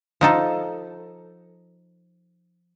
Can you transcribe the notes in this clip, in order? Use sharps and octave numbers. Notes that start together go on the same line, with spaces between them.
F3 D#4 A4